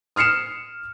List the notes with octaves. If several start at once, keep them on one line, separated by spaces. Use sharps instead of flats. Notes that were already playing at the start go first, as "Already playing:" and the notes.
D#6 F6 C7 C#7 E7